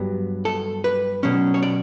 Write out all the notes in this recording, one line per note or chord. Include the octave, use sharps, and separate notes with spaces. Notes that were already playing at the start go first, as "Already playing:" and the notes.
Already playing: G2 F#3 B3
A4
B4
B2 F#3 C#4
C#5
D5